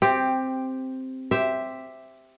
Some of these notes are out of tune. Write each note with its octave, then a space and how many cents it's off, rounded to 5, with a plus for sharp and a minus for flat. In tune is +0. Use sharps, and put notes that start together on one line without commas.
C4 +0 G4 +10
G4 +0 C5 +0 E5 +0